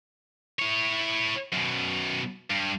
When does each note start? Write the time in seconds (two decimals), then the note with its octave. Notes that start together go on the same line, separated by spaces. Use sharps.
0.59 E4 C#5
1.53 F#2 B2
2.50 G2